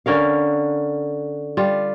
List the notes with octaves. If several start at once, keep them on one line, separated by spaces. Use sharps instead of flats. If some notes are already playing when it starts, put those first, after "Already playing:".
D3 C#4 A#4 F5
G3 F4